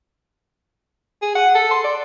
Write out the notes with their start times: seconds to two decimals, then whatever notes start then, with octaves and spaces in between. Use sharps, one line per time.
1.22 G#4
1.35 F#5
1.55 A4
1.71 C6
1.84 D5